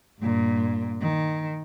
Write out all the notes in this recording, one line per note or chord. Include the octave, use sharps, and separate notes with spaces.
G2 A#2
D#3